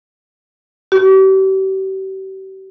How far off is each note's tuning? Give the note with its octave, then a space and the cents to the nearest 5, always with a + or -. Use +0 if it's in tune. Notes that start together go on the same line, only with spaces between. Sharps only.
G4 -40